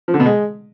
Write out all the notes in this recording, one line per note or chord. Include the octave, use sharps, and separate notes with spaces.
F3
D3
B2
G#3